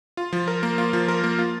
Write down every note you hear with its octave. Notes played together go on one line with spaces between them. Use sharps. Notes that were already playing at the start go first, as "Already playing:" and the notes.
F4
F3
A#4
A#3
F4
F3
A#4
A#3
F4